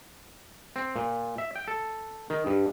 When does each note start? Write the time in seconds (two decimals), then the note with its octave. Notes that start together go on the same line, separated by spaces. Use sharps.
0.76 C4
0.96 A#2
1.38 E5
1.56 G5
1.68 A4
2.30 D#3
2.46 G2